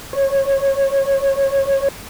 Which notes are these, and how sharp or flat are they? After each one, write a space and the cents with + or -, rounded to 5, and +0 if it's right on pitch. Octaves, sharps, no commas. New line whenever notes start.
C#5 -20